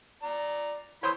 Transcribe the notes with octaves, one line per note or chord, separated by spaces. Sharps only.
D5 A#5
E2 E3 C5 C#5 B5